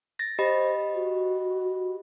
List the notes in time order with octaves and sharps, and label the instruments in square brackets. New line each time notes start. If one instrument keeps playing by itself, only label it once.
[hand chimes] A6 A#6
[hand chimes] G4 D#5 B5 [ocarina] C5
[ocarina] F#4